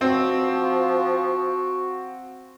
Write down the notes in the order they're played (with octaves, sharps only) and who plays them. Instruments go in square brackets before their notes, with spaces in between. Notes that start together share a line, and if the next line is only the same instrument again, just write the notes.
[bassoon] F3 [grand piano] C4 [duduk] F#4